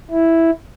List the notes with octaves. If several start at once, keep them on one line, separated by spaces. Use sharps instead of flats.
E4